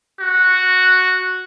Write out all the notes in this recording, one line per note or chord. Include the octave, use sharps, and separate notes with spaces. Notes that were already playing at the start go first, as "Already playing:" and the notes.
F#4